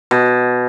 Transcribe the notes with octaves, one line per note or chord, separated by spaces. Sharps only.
B2